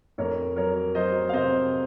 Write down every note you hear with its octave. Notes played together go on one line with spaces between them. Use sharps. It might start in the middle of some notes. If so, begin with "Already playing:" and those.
F2 A#4 C#5
F#3 A#4 C#5
F#3 C5 D#5
F5
C3 C5 D#5